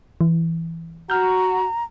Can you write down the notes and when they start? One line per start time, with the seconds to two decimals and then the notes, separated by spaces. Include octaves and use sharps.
0.21 E3
1.10 F#4 A#5 F6 G6